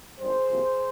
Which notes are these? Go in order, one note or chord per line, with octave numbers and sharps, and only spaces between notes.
G#1 G2 G3 G#4 C5
C2 C3 F3 A#3